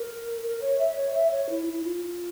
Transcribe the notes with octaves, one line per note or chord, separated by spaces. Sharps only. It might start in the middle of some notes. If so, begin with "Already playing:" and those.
Already playing: A#4
A#4
C#5
E5
C#5
E5
C#5
E4
E4
F4